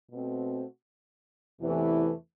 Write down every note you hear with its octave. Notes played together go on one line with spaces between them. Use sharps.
B2 A3 C4 F#4
E2 C3 E3 A3